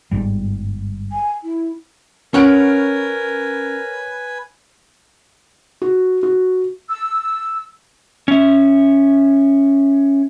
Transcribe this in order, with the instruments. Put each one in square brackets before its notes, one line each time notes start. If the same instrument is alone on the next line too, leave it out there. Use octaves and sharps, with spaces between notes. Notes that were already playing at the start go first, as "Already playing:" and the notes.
[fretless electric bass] G1 G#2 G3
[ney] G#5
E4
[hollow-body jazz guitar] C#4 F#5 [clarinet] A#4 [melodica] B4 G#5 [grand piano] C#5 F6 D7
[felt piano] F#4
F#4
[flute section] E6
[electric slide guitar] C#4 E5